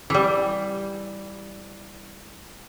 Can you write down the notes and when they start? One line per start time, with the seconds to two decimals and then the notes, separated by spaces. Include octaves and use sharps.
0.10 E3 G3